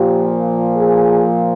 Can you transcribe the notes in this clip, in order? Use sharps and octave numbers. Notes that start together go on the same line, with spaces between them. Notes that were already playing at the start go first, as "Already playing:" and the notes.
Already playing: A#2 F3 G4
G#4